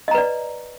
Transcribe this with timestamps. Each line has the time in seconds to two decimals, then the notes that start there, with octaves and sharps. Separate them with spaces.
0.08 D#5
0.11 A#5
0.14 B4
0.18 D5